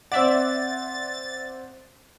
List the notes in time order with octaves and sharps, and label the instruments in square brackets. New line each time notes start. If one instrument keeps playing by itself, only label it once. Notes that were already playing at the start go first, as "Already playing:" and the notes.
[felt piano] C4 F#5 [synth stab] D5 E5 [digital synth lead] A6